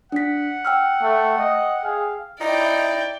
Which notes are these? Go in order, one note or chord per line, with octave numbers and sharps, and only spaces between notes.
D4 F#5 B6
G5 E6 F6
A3
D#5
G#4 F5
D#4 E4 D5 G5